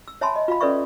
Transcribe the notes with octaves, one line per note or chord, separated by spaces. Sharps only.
E6
C#5 E5 G#5 A5 B5 C6
D#5
F4 F5 B5
C#4 A4 B4 D5 E5 C#6